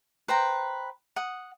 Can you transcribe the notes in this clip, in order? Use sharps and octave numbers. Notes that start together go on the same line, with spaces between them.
B4 C5 G5 A#5
F#5 D#6